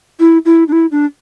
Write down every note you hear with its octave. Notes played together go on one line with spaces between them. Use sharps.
E4
E4
D4
E4
D4